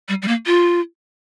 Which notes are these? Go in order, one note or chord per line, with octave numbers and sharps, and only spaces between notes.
G3
G3
A#3
F4